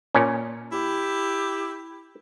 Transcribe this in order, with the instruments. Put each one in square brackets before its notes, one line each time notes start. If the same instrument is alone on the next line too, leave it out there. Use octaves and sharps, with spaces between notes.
[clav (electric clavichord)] A#2 C#4
[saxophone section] E4 G4